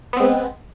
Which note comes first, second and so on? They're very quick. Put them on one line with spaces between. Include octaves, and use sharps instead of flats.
B3 C4 G#3 B4